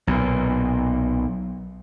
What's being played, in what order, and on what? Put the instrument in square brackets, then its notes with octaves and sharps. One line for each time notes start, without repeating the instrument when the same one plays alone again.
[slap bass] B1 A#2